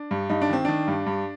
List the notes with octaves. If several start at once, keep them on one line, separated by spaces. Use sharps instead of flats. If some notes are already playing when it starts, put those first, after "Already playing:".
Already playing: D4
G2
G2 D#4
D4
D#3 C4
D#3 D4
G2
G2